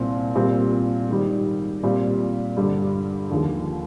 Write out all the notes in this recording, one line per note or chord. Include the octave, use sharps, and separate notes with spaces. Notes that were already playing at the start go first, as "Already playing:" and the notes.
Already playing: C2 A#2 C4
A#2 G3 C4
G#2 D#3 G3
A#2 G3 C4
G2 D3 G3
D#2 D3 F3 G#3